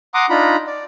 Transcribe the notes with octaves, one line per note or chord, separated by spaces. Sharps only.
F#5 A#5 C6 D6 D#6
D4 D#4 F4 A#5 B5
D5